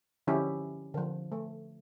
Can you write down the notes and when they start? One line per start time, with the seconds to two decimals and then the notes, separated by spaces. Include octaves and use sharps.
0.27 D3 F3 C#4 E4 G4 G#4
0.94 D3 F3
1.32 A3